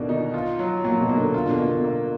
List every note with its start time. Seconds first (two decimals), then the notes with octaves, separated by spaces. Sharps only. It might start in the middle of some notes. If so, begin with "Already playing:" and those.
Already playing: B2 D3 D#3 A#3 D5
0.09 D#4
0.34 F4
0.59 F#3
0.84 A#2 F#3
1.01 B2
1.09 A#3
1.17 D3
1.34 F4
1.45 D3
1.50 B2
1.59 A#3
1.67 B2
1.84 A#3